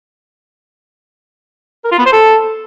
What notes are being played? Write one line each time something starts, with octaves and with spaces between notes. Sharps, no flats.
A#4
F4
B3
C5
A4